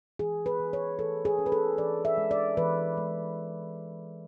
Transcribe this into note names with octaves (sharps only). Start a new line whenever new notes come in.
E3 G#4
B4
E3
C#5
E3 A4
G#4
C#4
B4
A4
E3 D5
E5
G#3
D5
E3 B4
G#3